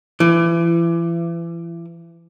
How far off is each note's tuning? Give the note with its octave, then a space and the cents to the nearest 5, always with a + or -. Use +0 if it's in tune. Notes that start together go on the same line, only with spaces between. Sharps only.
E3 +35